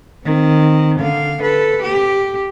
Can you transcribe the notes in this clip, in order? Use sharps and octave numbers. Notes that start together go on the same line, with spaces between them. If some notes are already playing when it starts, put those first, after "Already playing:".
D#3 C4
D3 F5
A4 B4
G4